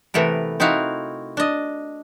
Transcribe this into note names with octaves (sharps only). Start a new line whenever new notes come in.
C3 E3 A3 B3 A#4
C4 D#4 E4 F#4 F5
D4 D#5